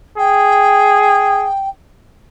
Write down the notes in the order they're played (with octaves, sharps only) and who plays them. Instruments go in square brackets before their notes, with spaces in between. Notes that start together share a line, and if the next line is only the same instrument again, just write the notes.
[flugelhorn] G#4 [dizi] G5